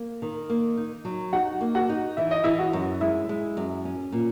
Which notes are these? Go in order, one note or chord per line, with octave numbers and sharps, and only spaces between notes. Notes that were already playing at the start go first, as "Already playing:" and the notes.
Already playing: A#3
D#3
A#3
D#4
F#3
D#4 F#4 F#5
A#3
F#4 F#5
D#4
E3 E5
D#5
E3 E4 E5
F#4 F#5
F#2
G#3 E4 E5
G#3
F#2
C#4
A#2